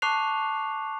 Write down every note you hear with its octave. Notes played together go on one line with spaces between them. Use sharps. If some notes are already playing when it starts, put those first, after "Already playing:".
A5 C#6 D6 F#6 C7 F7